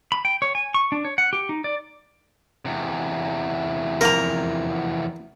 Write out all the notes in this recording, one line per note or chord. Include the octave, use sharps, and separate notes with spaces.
B5
G5
C#5
G#5
C#6
D4
C#5
F#5
G4
D#4
D5
E2 C3
F2 A#4 A#5